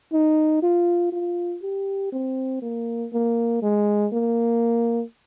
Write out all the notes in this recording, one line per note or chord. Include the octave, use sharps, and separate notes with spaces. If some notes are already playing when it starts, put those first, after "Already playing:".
D#4
F4
F4
G4
C4
A#3
A#3
G#3
A#3